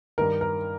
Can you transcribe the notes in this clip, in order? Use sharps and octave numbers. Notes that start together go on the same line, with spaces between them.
G2 D#3 A#4
A#4